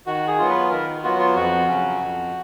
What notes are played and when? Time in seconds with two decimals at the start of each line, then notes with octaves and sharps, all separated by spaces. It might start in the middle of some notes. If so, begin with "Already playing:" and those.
0.06 D#3 F#4
0.28 G#4
0.39 F#3 B3 F4
0.49 B4
0.71 D#3 A#4
1.03 F#3 B3 F4 F#4
1.19 F4
1.35 F2 F#4
1.68 C#3 F#3 C#4
2.00 F2